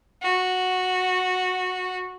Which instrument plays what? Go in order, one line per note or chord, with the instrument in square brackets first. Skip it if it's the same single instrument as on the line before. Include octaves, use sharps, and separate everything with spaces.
[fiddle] F#4